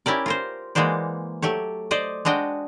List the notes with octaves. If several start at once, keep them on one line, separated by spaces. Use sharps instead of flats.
C#4 E4 G4 A#4 D5
F4 A#4 C5
E3 G#3 A#3 F#4 C5 D5
F#3 A3 G4 C#5
C5 D5 D#5
G#3 D4 F#4 D#5 G5